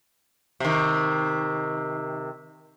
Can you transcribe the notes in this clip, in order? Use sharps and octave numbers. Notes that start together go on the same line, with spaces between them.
C3 D#3